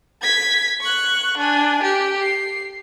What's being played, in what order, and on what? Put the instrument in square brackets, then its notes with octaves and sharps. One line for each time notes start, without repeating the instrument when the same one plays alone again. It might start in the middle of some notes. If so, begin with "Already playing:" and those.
[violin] G#6 B6
C#6 F#6
D4 G#5
G4
C7